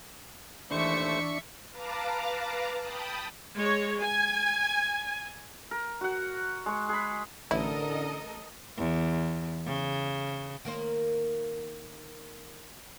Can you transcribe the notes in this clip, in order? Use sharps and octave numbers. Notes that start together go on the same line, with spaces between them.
D#2 E3 A3 D4 C5 E5 C#6
B4 F5 A5 A#5 D6
G5 A5 B5 D#6
G#3 C#5
G#5
A#4
F#4 F#5
G#3 C#6
G#4 B5
A1 D3 E4 A4 A#4 D#5
E2
C#3
D#3 A#3 C5